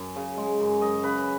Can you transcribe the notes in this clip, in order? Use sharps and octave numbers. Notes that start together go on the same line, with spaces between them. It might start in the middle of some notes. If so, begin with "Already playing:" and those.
Already playing: F#2
C#3
G#3
F#2
F#2 D#5
C#3 B4